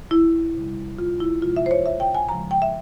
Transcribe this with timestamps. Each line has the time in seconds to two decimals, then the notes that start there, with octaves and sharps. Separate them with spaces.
0.11 E4
0.55 C3 G3
0.98 F4
1.20 E4
1.42 C3 F3 G#3 F4
1.56 E5
1.66 C5
1.71 C#5
1.86 E5
2.00 G5
2.15 G#5
2.29 C#3 F3 G#3 A#5
2.51 G5
2.62 E5